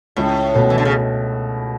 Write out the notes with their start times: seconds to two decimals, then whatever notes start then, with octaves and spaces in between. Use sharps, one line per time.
0.16 C#2 A2
0.55 B2 A3
0.70 E3
0.78 D3
0.85 C#3